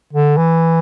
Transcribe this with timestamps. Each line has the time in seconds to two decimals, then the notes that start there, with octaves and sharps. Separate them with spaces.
0.13 D3
0.37 E3